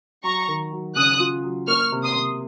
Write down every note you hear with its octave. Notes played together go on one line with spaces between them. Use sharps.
F#3 A#5 C#6
D#3
F#3
C#3 D#6 F#6
F4
F#3
A#3 C#6 F6
C3
C6 D#6
C3